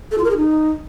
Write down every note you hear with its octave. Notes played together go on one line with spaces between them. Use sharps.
A4
F4
A#4
G#4
D#4